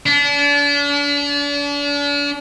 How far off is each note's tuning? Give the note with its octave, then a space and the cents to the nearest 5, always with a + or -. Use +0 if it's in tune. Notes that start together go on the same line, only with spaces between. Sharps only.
D4 -40